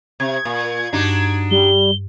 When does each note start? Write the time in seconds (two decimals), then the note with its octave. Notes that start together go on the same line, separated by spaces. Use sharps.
0.20 C3 G#6
0.45 A#2
0.93 G2 D4 D#4 F#4
1.51 G3 G7